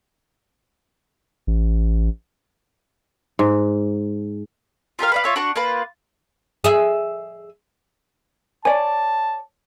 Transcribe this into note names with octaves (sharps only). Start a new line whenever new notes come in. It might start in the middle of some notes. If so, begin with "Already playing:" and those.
A1
G#2
F4 G4 A#4 F5
B4 D5 F5
F4 C#5 E5
D4 F#4 F#5 C#6
A#3 F4 B4
G#4 E5
C#5 D5 G#5 A5